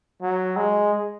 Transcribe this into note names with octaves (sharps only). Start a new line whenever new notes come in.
F#3
G#3